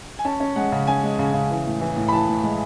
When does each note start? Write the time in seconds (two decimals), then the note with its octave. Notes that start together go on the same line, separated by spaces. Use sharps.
0.19 G#5
0.25 C#4 A5
0.40 C#4
0.56 G#3 F#5
0.72 C#3
0.87 C#4 G#5
1.03 G#3
1.19 C#3
1.34 C#3
1.50 E3
1.66 A2
1.81 E3
1.97 A2
2.08 B5
2.12 E3 A5
2.28 A2
2.44 G#3